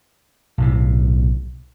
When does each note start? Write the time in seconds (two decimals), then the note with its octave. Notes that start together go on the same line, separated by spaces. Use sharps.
0.58 B1 A2 C3